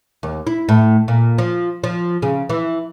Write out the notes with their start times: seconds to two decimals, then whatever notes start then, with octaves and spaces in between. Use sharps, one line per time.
0.23 D#2
0.47 E4
0.69 A2
1.08 A#2
1.38 F3
1.84 F3
2.22 C#3
2.49 E3